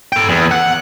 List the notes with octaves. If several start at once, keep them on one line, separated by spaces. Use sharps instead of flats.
A4 G5
E2
F#5